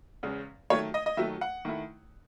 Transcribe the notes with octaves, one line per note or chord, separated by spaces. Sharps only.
E2 C#3 G#3
D#3 F#3 A3 C#5
D#5
D#5
D#3 F#3 A3 E5
F#5
D#3 A3 E4